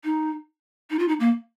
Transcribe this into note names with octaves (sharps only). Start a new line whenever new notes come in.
D#4
D#4
F4
D#4
A#3